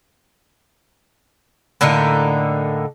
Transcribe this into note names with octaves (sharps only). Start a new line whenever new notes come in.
A2 D3 A#3 D#4